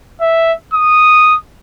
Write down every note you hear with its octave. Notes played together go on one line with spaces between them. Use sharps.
E5
D#6